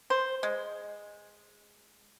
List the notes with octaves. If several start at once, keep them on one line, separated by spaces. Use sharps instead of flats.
C5
G#3